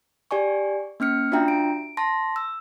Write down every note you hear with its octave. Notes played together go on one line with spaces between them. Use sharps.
G4 D5 G#5 C#6
A#3 C#4 F6 C#7
D4 F4 F#4 E5 G5 A#5
D7
A5 C6 A#6
E6